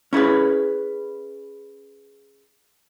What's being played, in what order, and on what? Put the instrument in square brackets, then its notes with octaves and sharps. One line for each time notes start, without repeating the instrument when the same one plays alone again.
[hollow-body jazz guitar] C#4 E4 G#4 B4